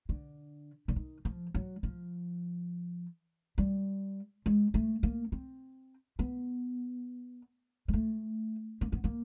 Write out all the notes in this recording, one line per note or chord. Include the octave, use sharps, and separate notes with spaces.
D3
D3
D#3
F3
F#3
F3
G3
G#3
A3
A#3
C4
B3
G#3
A3
A#3
B3
A#3